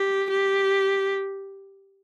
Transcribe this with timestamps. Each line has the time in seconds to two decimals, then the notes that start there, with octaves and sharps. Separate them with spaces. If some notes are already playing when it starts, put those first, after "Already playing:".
Already playing: G4
0.30 G4